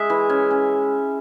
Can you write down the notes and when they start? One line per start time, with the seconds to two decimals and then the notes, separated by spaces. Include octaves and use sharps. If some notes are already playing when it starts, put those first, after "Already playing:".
Already playing: G#3 E5
0.10 E3
0.30 C#4
0.51 C#4